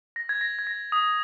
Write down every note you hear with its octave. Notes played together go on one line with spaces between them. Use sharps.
A#6
G#6
A#6
G#6
A#6
D#6